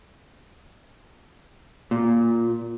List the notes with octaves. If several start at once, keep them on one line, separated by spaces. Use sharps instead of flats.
A#2